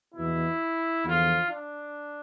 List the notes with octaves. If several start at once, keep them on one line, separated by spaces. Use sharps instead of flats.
E2 B2 E4
E2 D3 F3 F4
D4